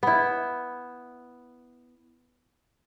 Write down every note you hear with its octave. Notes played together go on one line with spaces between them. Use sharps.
B3 E4